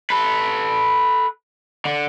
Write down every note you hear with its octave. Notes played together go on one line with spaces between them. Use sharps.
A4 B4
D3